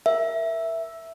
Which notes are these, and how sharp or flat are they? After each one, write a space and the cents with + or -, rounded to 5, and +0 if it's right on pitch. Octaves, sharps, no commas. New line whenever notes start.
A#4 +0 E5 +0